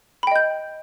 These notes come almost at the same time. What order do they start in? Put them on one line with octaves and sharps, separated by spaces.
B5 G5 D#5 G6